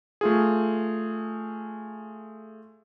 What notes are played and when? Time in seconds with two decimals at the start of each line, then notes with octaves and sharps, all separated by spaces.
0.21 A3 F4 G#4